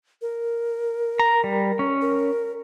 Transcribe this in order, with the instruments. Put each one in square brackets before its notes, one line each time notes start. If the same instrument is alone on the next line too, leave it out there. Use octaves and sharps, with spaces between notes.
[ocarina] A#4
[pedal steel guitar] A#5
G3
C#4
[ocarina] A#4